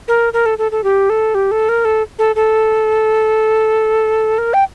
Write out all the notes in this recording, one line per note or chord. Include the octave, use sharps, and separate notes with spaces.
A#4
A#4
A4
A4
A4
G4
A4
G4
A4
A#4
A4
A4
A4
A#4
G5